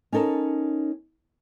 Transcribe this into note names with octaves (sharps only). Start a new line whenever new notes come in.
C#4 D#4 A4 A#4